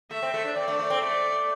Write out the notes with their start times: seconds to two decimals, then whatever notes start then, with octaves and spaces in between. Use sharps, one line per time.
0.10 A3 E5
0.22 C4
0.34 A3
0.44 D4
0.56 C4 D5
0.68 A3
0.79 A3
0.90 C4
1.01 A3 D5